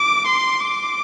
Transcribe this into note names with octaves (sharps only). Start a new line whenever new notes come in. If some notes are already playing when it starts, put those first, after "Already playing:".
Already playing: D6
C6
D6